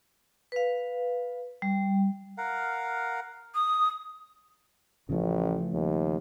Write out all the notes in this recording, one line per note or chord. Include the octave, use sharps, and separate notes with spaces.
B4 F5
G3
A#4 F5 F#5
D#6
A1 C#3 F3 A3
D#2